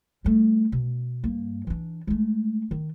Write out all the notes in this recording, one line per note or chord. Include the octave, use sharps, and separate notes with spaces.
G3 A3
B2
G2 A#3
E3 D4
G#3 A3
D#3